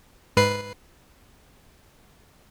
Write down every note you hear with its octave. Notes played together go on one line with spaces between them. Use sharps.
G#2 B4 C7